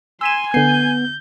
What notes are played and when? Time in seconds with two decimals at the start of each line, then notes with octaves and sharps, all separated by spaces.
0.21 G#5 C6 E6 B6 E7
0.54 D3 B3 G6 C7